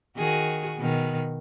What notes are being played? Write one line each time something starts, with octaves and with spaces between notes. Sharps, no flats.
D#3 F#4 G#4
B2 D#3